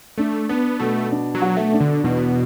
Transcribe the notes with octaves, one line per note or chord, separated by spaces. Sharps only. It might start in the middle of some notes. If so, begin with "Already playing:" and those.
A3 D4
B3 D4
B2 A3
D4
F#3
F#4
A3
D4
D3
E2 B2